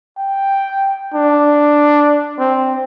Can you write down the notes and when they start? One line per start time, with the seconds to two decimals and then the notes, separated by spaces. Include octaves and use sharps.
0.17 G5
1.14 D4
2.38 C4